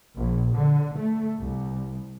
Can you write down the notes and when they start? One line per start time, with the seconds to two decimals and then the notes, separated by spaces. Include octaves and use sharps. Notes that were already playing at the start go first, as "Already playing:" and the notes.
0.17 A#1
0.58 D3
0.97 A3
1.42 C2